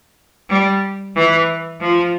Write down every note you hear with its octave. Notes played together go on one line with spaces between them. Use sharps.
G3
E3
F3